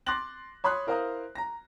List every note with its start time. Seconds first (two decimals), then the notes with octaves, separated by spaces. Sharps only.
0.06 C6 D6 F#6 A6 A#6 F#7
0.64 C#5 B5 C6 D#6 F#6
0.87 E4 A#4 C5 F5 A#5 D#6
1.35 A#5 A#6